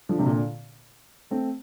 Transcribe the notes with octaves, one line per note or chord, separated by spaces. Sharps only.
D3 F3
C3
A#2 D3
A3 C4